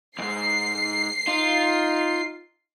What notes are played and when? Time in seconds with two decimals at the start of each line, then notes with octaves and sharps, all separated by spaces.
0.19 E2 G#2 C7
1.28 D#4 F4